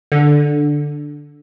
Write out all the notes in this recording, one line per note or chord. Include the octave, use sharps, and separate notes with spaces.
D3